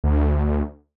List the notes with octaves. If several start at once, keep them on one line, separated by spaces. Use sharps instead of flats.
D2